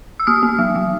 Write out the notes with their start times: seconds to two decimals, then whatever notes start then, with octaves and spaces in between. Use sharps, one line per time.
0.20 E6
0.27 A#3 D#6 F6
0.43 A#3
0.59 F#3
0.76 F#3